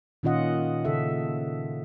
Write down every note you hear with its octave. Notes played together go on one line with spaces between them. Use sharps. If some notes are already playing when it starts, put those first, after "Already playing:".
A#2 D#3 C#4 F4 D#5 F#5
C#3 A4 E5